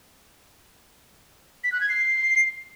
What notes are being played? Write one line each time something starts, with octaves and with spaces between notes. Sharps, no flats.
B6
F#6
G#6
C7